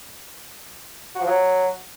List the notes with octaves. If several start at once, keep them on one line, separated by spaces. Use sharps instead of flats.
F#4
F3
F#3